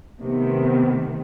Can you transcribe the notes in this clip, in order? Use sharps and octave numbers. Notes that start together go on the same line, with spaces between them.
C3 D#3 A3 B3